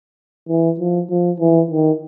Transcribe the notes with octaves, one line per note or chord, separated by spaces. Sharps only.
E3
F3
F3
E3
D#3